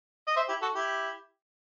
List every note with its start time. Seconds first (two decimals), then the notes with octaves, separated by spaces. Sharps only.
0.27 D#5
0.36 C5 E5
0.49 E4 G4
0.62 F#4 A4
0.74 E4 G4